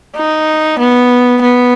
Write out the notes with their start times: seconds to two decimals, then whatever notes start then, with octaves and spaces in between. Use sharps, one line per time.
0.16 D#4
0.79 B3
1.42 B3